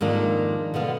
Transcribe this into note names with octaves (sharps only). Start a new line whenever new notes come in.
F2 G#2 D#3 A#3 D4
B2 D3 B3 F5